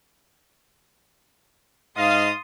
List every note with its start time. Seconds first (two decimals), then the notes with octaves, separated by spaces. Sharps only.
1.97 G#2 D#5 F5 C6 D#6 A6